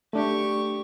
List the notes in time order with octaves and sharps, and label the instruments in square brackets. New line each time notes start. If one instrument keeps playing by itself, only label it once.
[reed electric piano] A3 D4 [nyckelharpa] G4 C#6